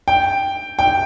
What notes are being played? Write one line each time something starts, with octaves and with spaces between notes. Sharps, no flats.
G5
G5